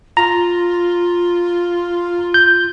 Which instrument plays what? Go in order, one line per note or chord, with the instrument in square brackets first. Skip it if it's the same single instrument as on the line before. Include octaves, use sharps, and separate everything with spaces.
[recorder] F4 [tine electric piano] A#5
[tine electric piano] G6